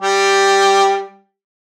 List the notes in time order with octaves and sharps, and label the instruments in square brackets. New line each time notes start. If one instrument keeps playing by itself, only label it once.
[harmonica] G3 G4